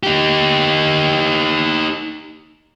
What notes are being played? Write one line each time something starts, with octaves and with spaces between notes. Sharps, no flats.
D#4 G4